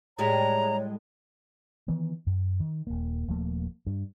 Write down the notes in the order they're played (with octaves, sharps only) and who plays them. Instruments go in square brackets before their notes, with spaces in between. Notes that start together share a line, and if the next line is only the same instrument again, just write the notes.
[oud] A2 G3 G#3 [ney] C#5 [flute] A#5
[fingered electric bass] D#3 E3 B3
F#2
D#3
D#1 A#3
D#1 F3 A3 A#3
G2